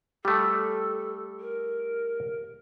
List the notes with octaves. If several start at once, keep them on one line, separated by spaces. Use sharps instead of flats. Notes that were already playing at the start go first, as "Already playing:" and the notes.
G3 A3 G4 A4
A#4